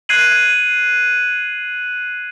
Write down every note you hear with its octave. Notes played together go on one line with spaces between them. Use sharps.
F#6 G#6 C7 D#7 F#7